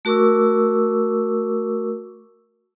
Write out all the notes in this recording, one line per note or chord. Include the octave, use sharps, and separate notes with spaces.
A3 F#4 A#4 C#6 D6 E6